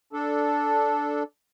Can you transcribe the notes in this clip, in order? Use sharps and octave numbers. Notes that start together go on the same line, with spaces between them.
D4 A4